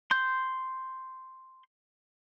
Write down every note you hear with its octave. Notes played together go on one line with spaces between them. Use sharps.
C6 G6